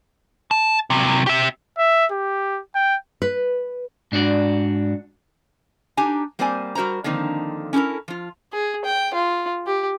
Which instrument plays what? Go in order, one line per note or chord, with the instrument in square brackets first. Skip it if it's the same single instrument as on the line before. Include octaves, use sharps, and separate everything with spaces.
[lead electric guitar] A5
C3 F#3
G4 E5
[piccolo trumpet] E5
G4
G5
[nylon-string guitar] B4
[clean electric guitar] G#2 D4 F#4 D5
[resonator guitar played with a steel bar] D4 D#4 G4 G#5 A#5
G3 A#3 C4 C5 D5 G#5
G3 F#4 A#4 C5 A#5
D3 D#3 F3 A#3 C4 D#4
C#4 E4 G4 A4 A#4
F3 F4
[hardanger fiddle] G#4
G5
F4
G4